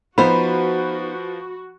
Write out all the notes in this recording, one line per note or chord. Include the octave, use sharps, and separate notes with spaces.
F3 B3 D#4 F#4 B4 C5 F5 B5